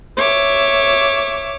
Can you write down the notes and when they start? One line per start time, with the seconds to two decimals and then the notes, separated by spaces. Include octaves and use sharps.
0.19 C#5 E5 D6